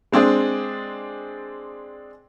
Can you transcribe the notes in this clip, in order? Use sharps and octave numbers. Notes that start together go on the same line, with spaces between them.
G#3 C4 D4 G#4